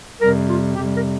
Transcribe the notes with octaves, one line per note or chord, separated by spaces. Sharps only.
F2 C3 G3 A#4
F4
F2 C3 G3 G4
A#4